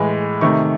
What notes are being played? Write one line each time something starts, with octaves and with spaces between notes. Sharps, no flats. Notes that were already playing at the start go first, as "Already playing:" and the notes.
Already playing: A2 E3 G#3
C3 D#3 A3 C#6